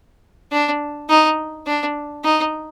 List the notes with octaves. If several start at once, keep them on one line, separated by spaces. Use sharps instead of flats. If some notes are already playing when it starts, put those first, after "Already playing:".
D4
D#4
D4
D#4